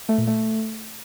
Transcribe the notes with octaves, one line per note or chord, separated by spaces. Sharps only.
A3
A#2
A3